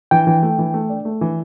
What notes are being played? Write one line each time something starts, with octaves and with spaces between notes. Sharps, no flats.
E3 G5
E3
A3
E3
A3
D4
A3
E3